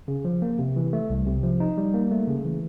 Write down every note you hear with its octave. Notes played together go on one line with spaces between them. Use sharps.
C#3
F3
A#3
C3
E3
A3
C2
C3
F3
D#4
G3
A#3
A3
C#3
E3